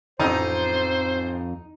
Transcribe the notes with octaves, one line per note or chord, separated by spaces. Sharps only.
A1 F2 D#4 C5